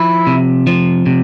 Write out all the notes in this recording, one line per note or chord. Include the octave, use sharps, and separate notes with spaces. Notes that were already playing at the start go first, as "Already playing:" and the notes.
Already playing: F3 E4
C3
F3
C3